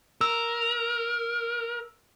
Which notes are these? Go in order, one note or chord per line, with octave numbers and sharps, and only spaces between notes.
A#4 E6